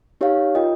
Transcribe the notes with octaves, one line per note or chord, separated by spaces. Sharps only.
D#4 G4 C#5 F5
F4 A#4 D#5 G5